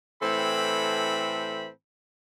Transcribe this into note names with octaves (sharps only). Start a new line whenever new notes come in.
A2 E3 C4 A4 G5 B5